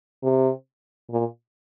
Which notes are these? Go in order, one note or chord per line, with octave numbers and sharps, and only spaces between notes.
C3
A#2